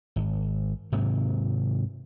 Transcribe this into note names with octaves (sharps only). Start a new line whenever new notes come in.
G#1
G#2 C3 D#3 F#3